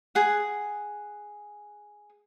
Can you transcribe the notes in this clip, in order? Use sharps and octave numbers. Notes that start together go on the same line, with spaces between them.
G#4 F#5